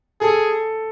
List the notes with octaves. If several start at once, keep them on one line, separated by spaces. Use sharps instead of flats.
G#4 A4